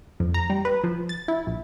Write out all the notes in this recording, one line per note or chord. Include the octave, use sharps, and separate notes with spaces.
F2
A#5
G3
B4
F3
A6
E4
A#1